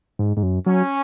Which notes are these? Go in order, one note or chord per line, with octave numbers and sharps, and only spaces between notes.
G#2
G#2
F#2
F#3 C#4